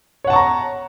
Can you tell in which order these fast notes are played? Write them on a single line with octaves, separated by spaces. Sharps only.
C#5 F#5 A5 C#6 A#5